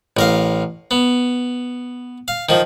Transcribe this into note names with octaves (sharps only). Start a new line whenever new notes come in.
A1 A#4 F5
B3
F5
D#3 F3